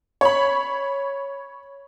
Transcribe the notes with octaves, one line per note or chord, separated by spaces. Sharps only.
C#5 B5